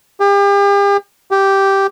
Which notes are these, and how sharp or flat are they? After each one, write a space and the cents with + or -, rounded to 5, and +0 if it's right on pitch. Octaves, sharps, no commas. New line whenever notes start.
G4 +40
G4 -5